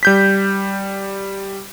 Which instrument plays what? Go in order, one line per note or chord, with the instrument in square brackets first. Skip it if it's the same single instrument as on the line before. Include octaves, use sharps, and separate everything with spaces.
[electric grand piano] G3 G6 B6